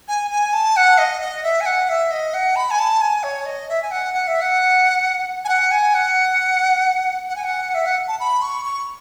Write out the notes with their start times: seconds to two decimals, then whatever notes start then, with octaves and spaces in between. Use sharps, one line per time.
0.08 G#5
0.31 G#5
0.53 A5
0.76 F#5
0.98 D#5
1.21 D#5
1.43 E5
1.61 G#5
1.66 F#5
1.89 E5
2.11 D#5
2.34 F#5
2.56 B5
2.71 G#5
2.79 A5
3.01 G#5
3.23 C#5
3.46 D#5
3.69 E5
3.82 G#5
3.91 F#5
4.14 F#5
4.27 E5
4.41 F#5
5.45 G#5
5.49 F#5
5.71 G#5
5.94 F#5
7.29 F#5
7.36 G#5
7.44 F#5
7.74 E5
7.86 F#5
8.08 A5
8.20 B5
8.42 C#6
8.65 C#6